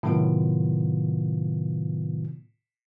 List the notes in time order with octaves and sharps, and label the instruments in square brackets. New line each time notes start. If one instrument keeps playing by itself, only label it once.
[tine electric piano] A2 C3 D#3 F#3 B3 F4